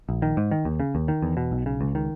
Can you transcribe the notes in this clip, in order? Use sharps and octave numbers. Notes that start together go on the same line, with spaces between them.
A#1
D#3
G#2
D#3
D#2
C#3
D#2
D#3
E2
B2
B1
C#3
C#2
D#3